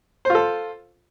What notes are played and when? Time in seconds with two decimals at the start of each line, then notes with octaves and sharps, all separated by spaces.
0.25 C5
0.30 F4
0.35 A4